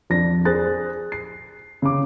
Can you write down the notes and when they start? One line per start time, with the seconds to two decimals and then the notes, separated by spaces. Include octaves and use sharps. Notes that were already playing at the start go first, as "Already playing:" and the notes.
0.10 F2 D4 A#6
0.45 G#4 C5 F#6 A6
1.12 C7
1.82 C#3 D6